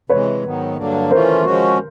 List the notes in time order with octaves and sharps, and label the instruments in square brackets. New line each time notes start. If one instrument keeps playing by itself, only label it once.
[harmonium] C3 E3 G#3 [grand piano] B4 C#5
[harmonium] G#2 D#3 F#3 B3 D#4
G2 D3 F#3 A#3 D4
[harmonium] E3 A3 C#4 F4 [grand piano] A#4 C5
[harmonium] F3 G#3 C#4 F#4